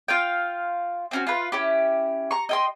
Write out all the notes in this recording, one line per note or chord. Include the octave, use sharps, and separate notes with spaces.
F4 F5 G5
C4 C#4 F#4
F4 B4
C#4 E4 G4
A#5 C#6
D#5 G5 C6